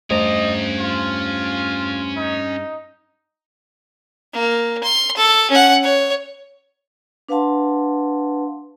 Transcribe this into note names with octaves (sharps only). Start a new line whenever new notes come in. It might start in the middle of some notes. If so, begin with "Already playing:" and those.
E2 G2 A3 C#4 C5 D#5 A#5
F4
D#4
A#3
C6
A4
C#4 F#5
C#5
D4 B4 F5 F#5 A5 C6